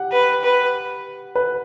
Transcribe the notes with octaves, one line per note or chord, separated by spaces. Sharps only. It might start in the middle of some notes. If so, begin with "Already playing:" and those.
Already playing: G4 F#5
B4
B4
B4